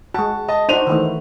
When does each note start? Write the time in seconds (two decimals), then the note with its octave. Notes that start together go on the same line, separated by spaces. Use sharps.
0.14 G#3 F#4 A5
0.48 D#5 A5
0.69 D4 D#4 F#4 C5 D#7 F7
0.87 D#3 E3 A3